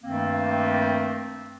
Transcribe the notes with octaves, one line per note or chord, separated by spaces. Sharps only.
G2 D#3 A3 A#3 C4